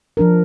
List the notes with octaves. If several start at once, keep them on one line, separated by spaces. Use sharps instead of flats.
F3 D4 A#4